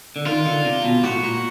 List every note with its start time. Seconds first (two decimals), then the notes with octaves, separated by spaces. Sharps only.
0.16 D3
0.26 D#3 F4
0.46 D3
0.65 C3
0.84 B2
1.03 A2 F#4
1.23 A#2